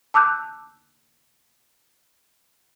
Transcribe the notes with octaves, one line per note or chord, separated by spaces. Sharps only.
A5 D6 E6 F#6 G6